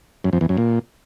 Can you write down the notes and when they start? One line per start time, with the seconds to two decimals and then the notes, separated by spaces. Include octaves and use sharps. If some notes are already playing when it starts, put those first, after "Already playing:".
0.24 F#2
0.33 F2
0.41 E2
0.49 F#2
0.57 A#2